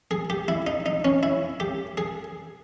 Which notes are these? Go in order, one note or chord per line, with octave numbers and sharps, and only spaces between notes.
G#4
G4
E4
D#4
D#4
C#4
E4
G4
G#4